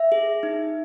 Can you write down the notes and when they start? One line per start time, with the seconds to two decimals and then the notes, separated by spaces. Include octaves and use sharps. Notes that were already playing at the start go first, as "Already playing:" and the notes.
Already playing: E5
0.12 G#4
0.43 D#4